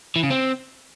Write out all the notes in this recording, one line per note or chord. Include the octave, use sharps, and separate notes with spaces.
E3
C#3
C4